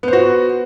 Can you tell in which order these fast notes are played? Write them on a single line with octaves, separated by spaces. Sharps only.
B3 C5 F#4